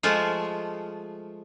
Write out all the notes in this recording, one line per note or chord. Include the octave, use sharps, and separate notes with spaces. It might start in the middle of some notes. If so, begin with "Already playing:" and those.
F3 G#3 A3 F4